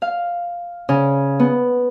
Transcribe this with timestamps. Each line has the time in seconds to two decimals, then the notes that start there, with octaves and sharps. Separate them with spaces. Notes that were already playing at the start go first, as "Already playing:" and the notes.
0.02 F5
0.89 C#3
1.40 B3